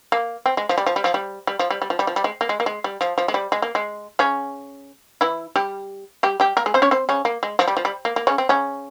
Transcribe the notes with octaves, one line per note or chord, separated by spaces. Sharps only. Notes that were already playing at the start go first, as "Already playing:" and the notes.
A#3
C4
G#3
F3
G3
F3
G3
F3
G3
G3
F3
G3
G3
F3
G3
F3
G3
G#3
A#3
G#3
A#3
G#3
G3
F3
F3
G#3
G3
G#3
A#3
G#3
C#3 C#4
E3 E4
G3 G4
G3 G4
G3 G4
A#3 A#4
G#3 G#4
C4 C5
C#4 C#5
C4 C5
C#3 C#4
A#3
G#3
F3
G3
F3
G3
A#3
A#3
C#3 C#4
C4
C#3 C#4